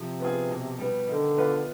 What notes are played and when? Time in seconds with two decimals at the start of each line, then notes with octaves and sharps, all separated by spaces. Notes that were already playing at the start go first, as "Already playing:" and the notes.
Already playing: C3 F3
0.20 B3 F4 G#4
0.49 B2
0.78 G3 B3
1.08 D3 D#3
1.37 B3 F4 B4